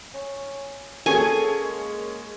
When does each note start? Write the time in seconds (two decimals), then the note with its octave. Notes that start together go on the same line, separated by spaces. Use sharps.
0.14 C#4
1.06 A#3 C#4 G#4 A4 G#5
1.65 G#3